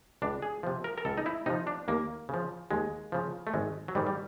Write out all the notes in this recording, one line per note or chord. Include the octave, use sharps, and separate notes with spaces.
C#2 D4
G#4
C3 F3
A#4
A#4
C#2 A4
D#4
E4
C3 F3 D#4
D4
D#2 A#3
C#3 F3
D#2 G#3
C#3 F3
A3
G#1 G#3
F#3
G#2 D#3 G3
G3